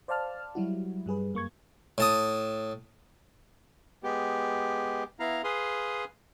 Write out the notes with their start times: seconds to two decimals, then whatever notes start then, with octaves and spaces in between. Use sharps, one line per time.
0.08 C5 D5 F5 A5 F6
0.55 F#3 G3 E4 F#4
1.06 G2 G3 G#4 B4
1.33 F#2 A#3 C#6 G#6
1.98 A2 A5 D#6
4.04 G#3 B3 G4
5.20 B3 E4 F5 A#5
5.44 G#4 B4 F5 C6 D#6